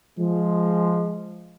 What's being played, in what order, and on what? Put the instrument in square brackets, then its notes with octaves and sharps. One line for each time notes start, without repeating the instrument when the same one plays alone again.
[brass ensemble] F3 G#3